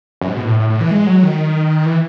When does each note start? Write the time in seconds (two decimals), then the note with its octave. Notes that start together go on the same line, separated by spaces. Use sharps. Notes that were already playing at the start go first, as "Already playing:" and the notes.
0.21 F#2
0.28 G#2
0.37 B2
0.45 A2
0.60 A2
0.70 A2
0.81 E3
0.91 G#3
1.07 F#3
1.23 D#3
1.86 E3